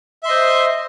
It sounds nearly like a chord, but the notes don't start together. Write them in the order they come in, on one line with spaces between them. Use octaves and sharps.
E5 C6 D#5 C5